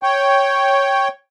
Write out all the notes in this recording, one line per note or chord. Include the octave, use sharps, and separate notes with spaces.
C#5 G5